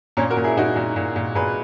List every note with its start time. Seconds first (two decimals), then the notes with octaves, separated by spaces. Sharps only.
0.17 A#2 A#3 C#4
0.30 F#4 A#4
0.37 A#2
0.44 E4 G#4
0.57 A#2 D#4 F#4
0.76 A#2
0.96 A#2
1.16 A#2
1.35 A#2 G#4 B4